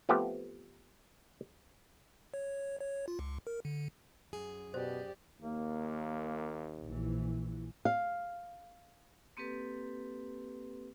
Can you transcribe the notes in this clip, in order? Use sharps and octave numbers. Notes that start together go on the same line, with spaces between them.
F3 A3 B3 C4 G4
C#5
C#5
F4
C#2
A#4
D3
F#2 G#4
B2 G4 C5 D5
D#2 A#3
A#1 E3
F5
A#3 C4 G4 A4 B4